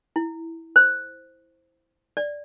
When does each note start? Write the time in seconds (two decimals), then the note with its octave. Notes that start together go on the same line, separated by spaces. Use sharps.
0.16 E4
0.76 C5
2.17 D5